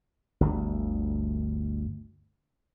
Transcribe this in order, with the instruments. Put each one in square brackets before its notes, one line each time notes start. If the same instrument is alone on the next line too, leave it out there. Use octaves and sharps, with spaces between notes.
[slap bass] G1 D2